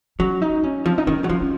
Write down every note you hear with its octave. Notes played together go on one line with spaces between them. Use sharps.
F#3 C#4
D#4
C#4
F3 C4
D#4
D#3 C#4
F#3
F3 C#4
C#4